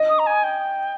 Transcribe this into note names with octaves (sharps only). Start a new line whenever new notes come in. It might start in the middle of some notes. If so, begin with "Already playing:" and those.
Already playing: D#5
D#6
A#5
G#5
G5